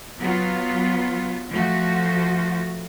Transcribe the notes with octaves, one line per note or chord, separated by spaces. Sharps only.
F#3 B3 F4
F3 A3 F#4